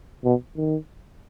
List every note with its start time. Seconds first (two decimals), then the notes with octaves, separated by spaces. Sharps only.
0.24 B2
0.57 D#3